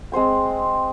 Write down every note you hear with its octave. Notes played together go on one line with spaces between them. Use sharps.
G#3 C4 C5 G5